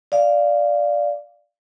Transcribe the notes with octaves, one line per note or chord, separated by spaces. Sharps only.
D5 F5